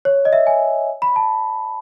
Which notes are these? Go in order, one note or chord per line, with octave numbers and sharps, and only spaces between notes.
C#5
D#5
E5
G#5
B5
A5